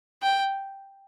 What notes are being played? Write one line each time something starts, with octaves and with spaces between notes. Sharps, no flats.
G5